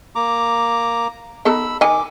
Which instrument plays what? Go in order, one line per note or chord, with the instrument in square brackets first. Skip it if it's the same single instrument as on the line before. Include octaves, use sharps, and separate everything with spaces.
[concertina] A#3 A#5 D6
[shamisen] B3 D#4 A4 [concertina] B5 E6
[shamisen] D#3 D#5 G#5 [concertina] D6